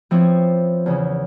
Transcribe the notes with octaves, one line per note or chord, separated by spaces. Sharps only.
F3 B3 C4 E4 C5 C#5
E2 C#3 C#4